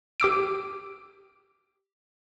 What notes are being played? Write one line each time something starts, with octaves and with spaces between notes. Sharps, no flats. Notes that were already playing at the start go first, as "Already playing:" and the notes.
G4 D6 E6 D7